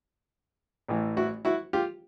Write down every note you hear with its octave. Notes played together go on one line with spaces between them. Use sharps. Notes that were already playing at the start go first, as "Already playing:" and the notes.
A1 A2 E3
E4 F#4
E4 F#4
F4 G4